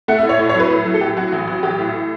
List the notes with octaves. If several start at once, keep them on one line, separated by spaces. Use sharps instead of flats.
A3 F#5
E5
A2
C#5
A2
C#5
F#3
B4
A2
F#3
A4
A2 G4
F#3 F#4
A1
F#3
A1 G4
A2